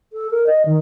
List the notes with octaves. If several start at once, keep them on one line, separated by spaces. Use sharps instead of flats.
A4
A#4
D#5
D#3